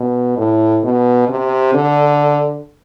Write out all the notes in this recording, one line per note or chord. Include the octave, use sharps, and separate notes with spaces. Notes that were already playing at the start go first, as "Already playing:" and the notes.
Already playing: B2
A2
B2
C3
D3